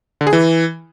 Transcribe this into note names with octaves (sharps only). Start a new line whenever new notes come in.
D3
G#4
E3